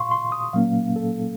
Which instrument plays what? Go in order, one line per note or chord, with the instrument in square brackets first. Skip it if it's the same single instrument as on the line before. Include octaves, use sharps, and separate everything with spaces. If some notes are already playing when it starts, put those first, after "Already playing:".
Already playing: [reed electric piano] A#2 F5 C6 C#6
C6
D#6
A#2 F#3 A#3 C#4 F5
A4